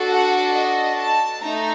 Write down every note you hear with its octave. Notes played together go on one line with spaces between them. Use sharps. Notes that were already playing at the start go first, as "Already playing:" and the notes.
Already playing: D4 F#4 A4
F#5
D#5
A5
A3 D#4 A#5